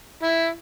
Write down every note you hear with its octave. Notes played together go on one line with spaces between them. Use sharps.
E4